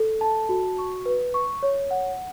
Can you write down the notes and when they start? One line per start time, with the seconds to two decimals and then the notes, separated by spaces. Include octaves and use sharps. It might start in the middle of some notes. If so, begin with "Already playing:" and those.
Already playing: A4
0.21 A5
0.49 F#4
0.78 C#6
1.06 B4
1.34 C#6
1.63 C#5
1.91 F#5